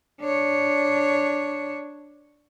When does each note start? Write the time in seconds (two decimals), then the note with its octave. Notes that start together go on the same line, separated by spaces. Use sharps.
0.21 D4 C#5